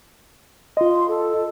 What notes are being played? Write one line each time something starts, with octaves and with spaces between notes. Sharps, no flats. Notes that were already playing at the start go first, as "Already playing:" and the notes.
F4 D#5 C6
A4